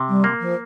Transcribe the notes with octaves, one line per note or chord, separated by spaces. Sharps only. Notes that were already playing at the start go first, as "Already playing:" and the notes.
Already playing: C3
G3
A#3
F3